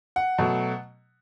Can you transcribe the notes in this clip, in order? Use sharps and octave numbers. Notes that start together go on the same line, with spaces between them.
F#5
B2 F#3 A3